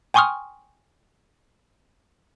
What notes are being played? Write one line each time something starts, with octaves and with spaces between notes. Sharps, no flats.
G5 G#5 C6 C#6 D#6 F6